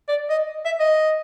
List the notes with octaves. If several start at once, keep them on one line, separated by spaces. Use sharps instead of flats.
D5
D#5
E5
D#5